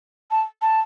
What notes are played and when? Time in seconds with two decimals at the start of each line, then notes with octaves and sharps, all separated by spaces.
0.31 A5
0.62 A5